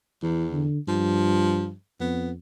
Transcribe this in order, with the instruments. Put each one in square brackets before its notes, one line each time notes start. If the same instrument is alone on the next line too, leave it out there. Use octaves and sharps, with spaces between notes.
[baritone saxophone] E2 [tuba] E3
[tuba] D3
[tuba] G2 [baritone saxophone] F3
[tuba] F2 [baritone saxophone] B3